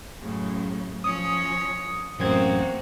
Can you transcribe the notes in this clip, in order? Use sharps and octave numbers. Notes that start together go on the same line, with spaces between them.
F#2 A2 C#3
F3 C#4 C#5 D#6
A1 F#2 A3 A#3 C4 F#4 G#6